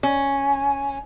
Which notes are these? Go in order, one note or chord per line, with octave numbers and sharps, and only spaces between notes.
C#4